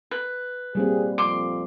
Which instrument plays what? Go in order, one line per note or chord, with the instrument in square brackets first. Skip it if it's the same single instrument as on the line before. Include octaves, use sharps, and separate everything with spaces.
[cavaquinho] B4
[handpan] G3 A#3 C4 [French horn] G#4
[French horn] F2 [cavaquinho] C6 D6